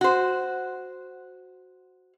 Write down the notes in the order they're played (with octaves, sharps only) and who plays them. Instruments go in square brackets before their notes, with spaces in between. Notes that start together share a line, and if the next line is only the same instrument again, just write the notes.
[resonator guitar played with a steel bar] F#4 C5